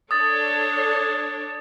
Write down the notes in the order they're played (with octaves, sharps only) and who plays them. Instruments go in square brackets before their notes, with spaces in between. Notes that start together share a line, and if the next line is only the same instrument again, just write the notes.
[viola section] D4 A4 C#5 [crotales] D#6 A6